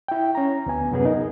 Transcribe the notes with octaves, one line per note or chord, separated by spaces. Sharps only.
E4 G5
C#4 A#5
D2 B3 G#5
F#2 C3 B3 C#4 G#4 B4
D#4 A#4